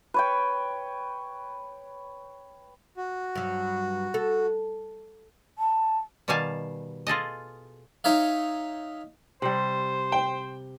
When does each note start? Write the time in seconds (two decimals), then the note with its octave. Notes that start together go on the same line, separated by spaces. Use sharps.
0.14 B4 C#5 G5
2.97 F#4
3.35 G2 F#3
4.14 A4
5.58 A5
6.28 B2 D#3 G3 F5 G#5 A5
7.07 F4 G#4 A4 D#5
8.04 D#4 C#5 E5 F5
9.42 C3 G3 C5
10.12 G5